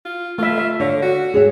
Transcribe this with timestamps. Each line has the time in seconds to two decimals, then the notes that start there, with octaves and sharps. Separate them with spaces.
0.05 F4
0.38 A3 F4 E5
0.58 E5
0.80 D3 C#5
1.02 F#4
1.34 G#4 C#5 E5